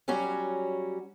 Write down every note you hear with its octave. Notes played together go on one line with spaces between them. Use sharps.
F#3 G3 C#4 F#4